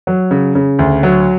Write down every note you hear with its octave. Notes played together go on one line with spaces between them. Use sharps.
F#3
C#3
C#3
D2
F#3